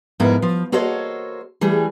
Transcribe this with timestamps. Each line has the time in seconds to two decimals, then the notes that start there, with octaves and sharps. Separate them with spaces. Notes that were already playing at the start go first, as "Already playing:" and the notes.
0.20 F2 G#2 B3 E4 A#4
0.42 F3
0.72 A#3 F#4 A4 C5 C#5 D#5
1.61 E3 G3 A3 G#4